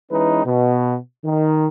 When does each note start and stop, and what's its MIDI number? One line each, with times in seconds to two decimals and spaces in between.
0.11 0.43 52
0.11 0.43 56
0.11 0.43 61
0.11 0.43 63
0.11 0.43 71
0.45 0.96 47
1.25 1.68 51